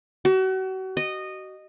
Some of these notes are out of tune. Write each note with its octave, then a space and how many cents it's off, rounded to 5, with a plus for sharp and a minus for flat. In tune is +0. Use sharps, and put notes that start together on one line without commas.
F#4 +35
D#5 -15